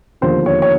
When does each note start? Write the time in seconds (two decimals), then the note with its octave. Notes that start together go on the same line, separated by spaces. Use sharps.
0.21 E1 D#2 D3 F3 C5
0.46 C#5
0.62 C#5